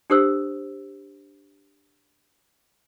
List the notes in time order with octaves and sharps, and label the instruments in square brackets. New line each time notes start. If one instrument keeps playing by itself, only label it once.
[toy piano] D4 G4 A4 C5 E6